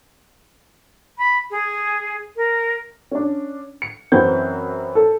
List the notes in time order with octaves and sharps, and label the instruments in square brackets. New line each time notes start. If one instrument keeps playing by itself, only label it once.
[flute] B5
G#4
A#4
[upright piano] C#4 D4
C#7
F#2 E3 C4 F#4 B4 G6
A4